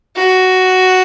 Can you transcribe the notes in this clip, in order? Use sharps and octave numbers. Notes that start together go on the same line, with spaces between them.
F#4